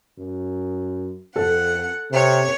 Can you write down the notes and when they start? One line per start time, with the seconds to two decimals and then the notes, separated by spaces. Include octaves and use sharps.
0.19 F#2
1.36 F2 A4 F#5
2.12 C3 C#5